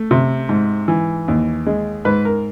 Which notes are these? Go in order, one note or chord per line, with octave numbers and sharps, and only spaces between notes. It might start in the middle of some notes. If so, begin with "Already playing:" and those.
Already playing: A3
C3
G#2
E3
D#2
G#3
G#2 B4
A#4